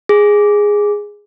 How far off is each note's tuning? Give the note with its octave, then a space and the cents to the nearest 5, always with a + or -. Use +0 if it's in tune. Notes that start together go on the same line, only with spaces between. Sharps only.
G#4 -5